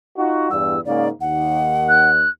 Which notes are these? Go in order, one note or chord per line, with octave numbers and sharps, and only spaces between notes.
D#4 F4 F#4
E2 G2 E6
G#2 C#3 A#3 D5
D#2 F#5
F#6